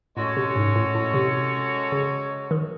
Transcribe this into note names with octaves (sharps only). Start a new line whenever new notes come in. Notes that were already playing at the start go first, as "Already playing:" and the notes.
A2 G#3 C#4 F#4 A4 C#5
C3
G#2
A2
A2
C3
C#3
D#3